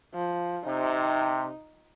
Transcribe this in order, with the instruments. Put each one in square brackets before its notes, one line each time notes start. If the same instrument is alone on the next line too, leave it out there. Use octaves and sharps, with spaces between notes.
[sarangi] F3
[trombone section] C3 [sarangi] D#4